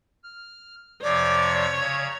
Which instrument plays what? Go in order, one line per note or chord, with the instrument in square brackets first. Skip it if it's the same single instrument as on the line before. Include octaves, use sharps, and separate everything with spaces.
[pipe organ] F6
[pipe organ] F2 C3 F3 [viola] C#5 [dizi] D5
[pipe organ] C#3 A#5 G#6